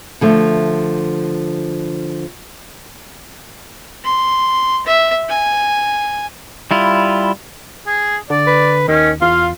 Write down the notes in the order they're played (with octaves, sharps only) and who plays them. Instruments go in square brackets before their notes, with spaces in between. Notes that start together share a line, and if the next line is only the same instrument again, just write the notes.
[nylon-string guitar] D3 F3 A3
[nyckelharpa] C6
E5
G#5
[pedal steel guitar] G3 E4 F4
[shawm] G#4
[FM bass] D3 [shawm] D5
[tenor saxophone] B4
[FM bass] D#2 [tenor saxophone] D#3 [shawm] C#4
[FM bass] E2 [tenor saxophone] F4 [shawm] F5